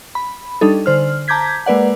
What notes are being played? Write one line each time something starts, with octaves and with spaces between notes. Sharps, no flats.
B5
G3 D4 D#4 A4
D3 C5 F6
A5 A#5 D6 G6 G#6 B6
G#3 A#3 B4 D5 F#5